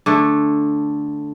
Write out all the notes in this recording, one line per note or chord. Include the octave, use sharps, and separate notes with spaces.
D3 A3